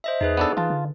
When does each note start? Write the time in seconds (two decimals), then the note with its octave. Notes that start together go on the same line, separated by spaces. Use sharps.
0.04 C5 D#5 E5
0.21 E2 D#4 G#4 B4
0.37 B3 D4 A4
0.57 E3 F4 A5
0.70 D3